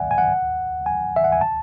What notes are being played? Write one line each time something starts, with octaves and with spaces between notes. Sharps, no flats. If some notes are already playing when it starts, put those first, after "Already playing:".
Already playing: D5 E5 F#5 G#5
G#5
F#5
G#5
E5
F#5
G#5
A5